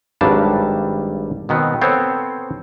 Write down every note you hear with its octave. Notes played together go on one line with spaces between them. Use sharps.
G#1 G2 F#3 G3 D4 A5
B2 D#3 B3 C4
B3 C4 A4 C5 C#5